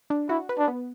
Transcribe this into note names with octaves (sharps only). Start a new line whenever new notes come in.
D4
E4 F#4
B4
D4
B3